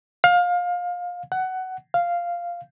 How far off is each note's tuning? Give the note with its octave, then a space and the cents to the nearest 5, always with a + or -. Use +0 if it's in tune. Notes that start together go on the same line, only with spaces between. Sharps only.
F5 +25
F#5 +15
F5 -5